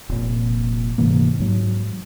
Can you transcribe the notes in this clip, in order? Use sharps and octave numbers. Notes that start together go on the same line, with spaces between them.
F1 F2 A#2
G#2 C3 E3 A#3
G#2 F#3